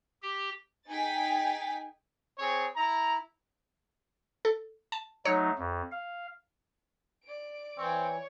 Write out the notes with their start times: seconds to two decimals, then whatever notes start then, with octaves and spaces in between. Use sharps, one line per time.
0.22 G4
0.88 D#4 G#4 G5 G#5 A6 B6
2.39 C4 G#4 C#5
2.75 E4 A#5
4.45 A4
4.92 A5
5.25 F#3 A3 D#4 C#5
5.58 F2
5.92 F5
7.24 D5 D7
7.78 E3 C4 C#5